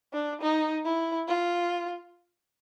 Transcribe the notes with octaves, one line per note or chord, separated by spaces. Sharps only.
D4
D#4
E4
F4